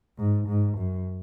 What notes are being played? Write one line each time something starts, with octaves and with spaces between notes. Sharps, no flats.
G#2
G#2
F#2